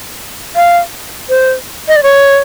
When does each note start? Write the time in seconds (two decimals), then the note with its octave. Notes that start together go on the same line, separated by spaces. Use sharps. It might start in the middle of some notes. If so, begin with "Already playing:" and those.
0.56 F5
1.29 C5
1.88 D#5
1.96 D5
2.03 C#5